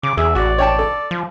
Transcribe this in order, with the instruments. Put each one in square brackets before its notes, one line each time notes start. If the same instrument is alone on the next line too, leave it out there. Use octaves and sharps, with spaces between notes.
[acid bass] C#3 [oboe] D6
[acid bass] E2 [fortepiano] G#4 [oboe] E5
[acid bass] A1 [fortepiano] F#4 [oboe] D5
[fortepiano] C#5 G5 A5
A4
[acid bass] F3